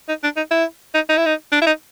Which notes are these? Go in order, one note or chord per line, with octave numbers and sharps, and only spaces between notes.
D#4
D4
D#4
E4
D#4
D#4
E4
D#4
D4
E4
D#4